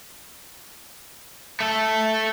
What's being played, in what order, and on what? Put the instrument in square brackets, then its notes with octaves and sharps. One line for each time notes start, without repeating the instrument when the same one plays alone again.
[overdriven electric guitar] A3 A4